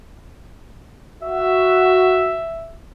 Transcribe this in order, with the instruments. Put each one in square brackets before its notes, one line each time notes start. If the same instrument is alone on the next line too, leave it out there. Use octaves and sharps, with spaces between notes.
[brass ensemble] F#4 [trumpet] E5